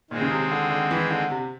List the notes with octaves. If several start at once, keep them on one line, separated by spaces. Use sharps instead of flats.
A#2 D#3 G#3 C4
C#3
C3
D3
D3
E3
D3
C3